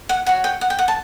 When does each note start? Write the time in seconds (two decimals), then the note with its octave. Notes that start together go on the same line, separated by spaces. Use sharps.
0.09 F#5
0.26 F#4 C#5 F#5
0.44 G5
0.61 F#5
0.70 G5
0.79 F#5
0.88 A5